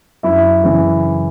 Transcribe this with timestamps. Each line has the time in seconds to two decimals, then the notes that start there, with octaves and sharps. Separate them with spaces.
0.23 F#2 E4 E5
0.64 C#3 E3